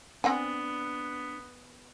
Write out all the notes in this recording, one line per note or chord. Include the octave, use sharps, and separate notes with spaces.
B3 C4 D4 F#5 G#5